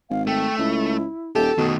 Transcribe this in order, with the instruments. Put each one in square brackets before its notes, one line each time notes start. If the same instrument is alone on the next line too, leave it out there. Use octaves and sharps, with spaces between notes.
[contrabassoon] G#1 [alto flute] F5
[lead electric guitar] A3 [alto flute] G5
[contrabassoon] C#2 [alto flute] E4
[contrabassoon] D#1 [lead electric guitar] G4 [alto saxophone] A4
[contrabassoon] B2 [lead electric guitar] D#3 A3